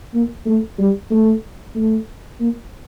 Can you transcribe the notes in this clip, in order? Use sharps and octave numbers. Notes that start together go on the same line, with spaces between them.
A#3
A3
G3
A3
A3
A#3